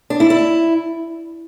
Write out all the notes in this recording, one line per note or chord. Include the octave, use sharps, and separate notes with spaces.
D4
E4
E4